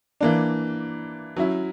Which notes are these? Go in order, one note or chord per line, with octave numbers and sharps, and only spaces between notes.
E3 A#3 D4
F#3 C#4 E4